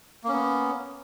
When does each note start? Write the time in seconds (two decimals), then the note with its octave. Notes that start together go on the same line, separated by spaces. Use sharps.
0.24 A#3
0.28 C#4
0.32 B3